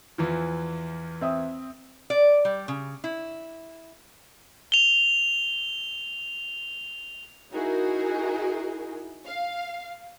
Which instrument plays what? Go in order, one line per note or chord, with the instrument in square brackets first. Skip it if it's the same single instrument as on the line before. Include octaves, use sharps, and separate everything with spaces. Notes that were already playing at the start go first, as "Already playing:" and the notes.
[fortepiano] E2 E3 F3
[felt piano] C4 E5 D#6
[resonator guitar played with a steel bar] D5
G3
C#3
E4
[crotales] F7 G7
[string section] D#4 E4 F#4 G#4 A#4
F5